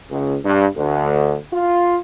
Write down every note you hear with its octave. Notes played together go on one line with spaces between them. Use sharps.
C#2
G2
D2
F4